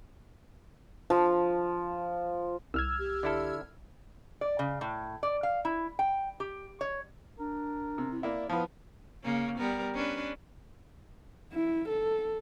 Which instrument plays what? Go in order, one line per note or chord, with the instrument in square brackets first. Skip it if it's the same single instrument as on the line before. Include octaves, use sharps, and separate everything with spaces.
[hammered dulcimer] F3
[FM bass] C2 [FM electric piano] E6 F6 G#6
[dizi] G4
[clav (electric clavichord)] D3 E4 A4
[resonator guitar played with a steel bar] D5
C#3
A2
D5
F5
E4
G5
G4
C#5
[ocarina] D4 [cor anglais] A#4
[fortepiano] C3
[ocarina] E4
[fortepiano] A#3 E4 [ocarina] D5
[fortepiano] F3 B3 [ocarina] E4 [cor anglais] F5
[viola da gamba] C#3 A#3 C#4
G3 B3 A#4
C#4 D4 B4
[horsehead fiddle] E4
A4